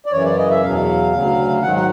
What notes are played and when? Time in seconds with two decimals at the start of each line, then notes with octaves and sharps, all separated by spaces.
0.06 D5
0.12 F#2 C#3 E3 C#5
0.25 D5
0.37 D#5
0.50 E5
0.62 E2 B2 F#3 F5
1.13 D2 C#3 F#3
1.63 G#2 D#3 F#3 F#5
1.76 F#5